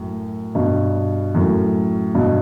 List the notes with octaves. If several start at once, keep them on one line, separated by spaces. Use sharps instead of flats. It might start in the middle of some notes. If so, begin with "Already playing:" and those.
Already playing: F#2 A2
G2 B2
F#2 A2
G2 B2